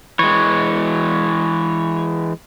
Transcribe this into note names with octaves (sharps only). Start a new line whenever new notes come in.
E3 G#3 C#5